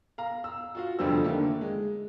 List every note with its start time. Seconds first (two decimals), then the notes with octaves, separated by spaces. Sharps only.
0.18 F5 A#5
0.44 E6
0.75 F4 F#4 F5
0.99 F1 F2 D3 G3 C5 E6
1.24 D3 D#3 A3 A#3
1.61 G#3